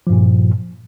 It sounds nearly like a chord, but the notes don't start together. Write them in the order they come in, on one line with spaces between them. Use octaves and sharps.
F3 G2 A#2